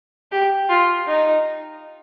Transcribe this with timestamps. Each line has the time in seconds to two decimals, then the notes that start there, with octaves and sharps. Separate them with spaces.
0.32 G4
0.69 F4
1.08 D#4